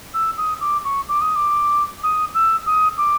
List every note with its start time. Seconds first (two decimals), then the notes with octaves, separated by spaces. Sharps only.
0.14 E6
0.38 D#6
0.61 D6
0.85 C#6
1.09 D6
1.22 D#6
1.36 D6
2.03 D#6
2.34 E6
2.66 D#6
2.98 D6